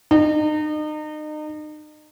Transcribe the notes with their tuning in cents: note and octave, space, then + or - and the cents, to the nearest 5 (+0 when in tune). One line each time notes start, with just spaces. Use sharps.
D#4 -35